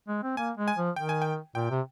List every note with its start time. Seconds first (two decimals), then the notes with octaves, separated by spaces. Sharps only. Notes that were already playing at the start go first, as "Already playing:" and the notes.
0.08 G#3
0.23 C4
0.37 A#3 G#5
0.57 G#3
0.68 G#5
0.77 F3
0.96 D#3 G5
1.09 G#5
1.22 G5
1.55 A#2 G5
1.70 C3